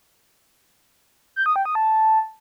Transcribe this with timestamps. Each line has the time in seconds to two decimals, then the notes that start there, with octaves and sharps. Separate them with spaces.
1.36 G6
1.46 D#6
1.56 G5
1.65 D#6
1.75 A5